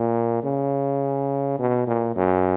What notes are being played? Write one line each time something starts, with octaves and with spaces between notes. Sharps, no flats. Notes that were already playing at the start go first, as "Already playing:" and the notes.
Already playing: A#2
C#3
B2
A#2
F#2